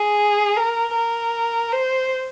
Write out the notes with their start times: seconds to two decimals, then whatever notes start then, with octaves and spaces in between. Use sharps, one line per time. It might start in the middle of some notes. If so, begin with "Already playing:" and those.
Already playing: G#4
0.56 A#4
0.95 A#4
1.72 C5